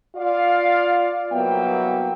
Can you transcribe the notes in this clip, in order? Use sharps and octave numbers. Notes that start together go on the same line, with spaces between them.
F4 D5 F5
C2 F#3 A#3 B3 E5 G5